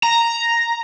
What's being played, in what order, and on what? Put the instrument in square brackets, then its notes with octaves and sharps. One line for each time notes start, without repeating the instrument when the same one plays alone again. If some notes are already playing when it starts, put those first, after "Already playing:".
[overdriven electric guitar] A#5